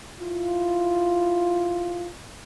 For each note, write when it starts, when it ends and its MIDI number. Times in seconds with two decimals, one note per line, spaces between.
0.20 2.08 64
0.20 2.08 65